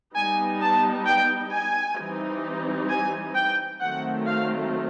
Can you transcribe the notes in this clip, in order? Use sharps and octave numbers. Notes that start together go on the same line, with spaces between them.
G3 B3 D#4 G#5
A5
G5
G#5
E3 G3 C4 D#4
G#5
G5
D#3 F#3 A3 C4 F#5
F5